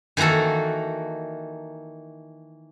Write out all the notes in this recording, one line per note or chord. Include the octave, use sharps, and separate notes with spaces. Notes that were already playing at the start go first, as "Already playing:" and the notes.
D#3 E3 A#3 F#4 A4